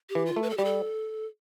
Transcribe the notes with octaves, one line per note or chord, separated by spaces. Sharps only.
G4
E3
F4
A3
B4
A4
G3 G4
A4